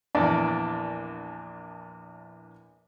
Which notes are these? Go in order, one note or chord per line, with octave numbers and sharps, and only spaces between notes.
A#1 E2 D4 D5